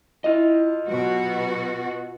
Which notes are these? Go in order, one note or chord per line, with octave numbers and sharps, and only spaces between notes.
E4 F4 D#5
B2 F#3 F#4 G4 B4